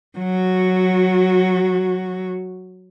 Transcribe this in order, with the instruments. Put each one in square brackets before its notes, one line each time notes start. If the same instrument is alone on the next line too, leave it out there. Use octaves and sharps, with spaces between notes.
[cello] F#3 F#4